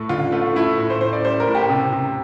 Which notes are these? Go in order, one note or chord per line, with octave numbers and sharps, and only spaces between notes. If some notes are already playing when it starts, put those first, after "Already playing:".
Already playing: A2 A3
D3 F4
A3 F4
A3 E4
A2
C5
A2 C5
D5
G3 C5
A#4
A2
G4
C3
C3